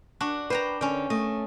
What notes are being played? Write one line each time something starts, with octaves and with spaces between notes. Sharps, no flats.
D4 F#4
B4 C5 G5 A#5
D3 C#4 G5
A3 D#5